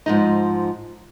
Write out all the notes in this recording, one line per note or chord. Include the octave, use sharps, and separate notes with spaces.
G#2 F3 D#4